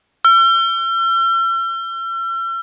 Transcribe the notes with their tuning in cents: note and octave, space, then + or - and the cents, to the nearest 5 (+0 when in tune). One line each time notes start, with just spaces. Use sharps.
E6 +45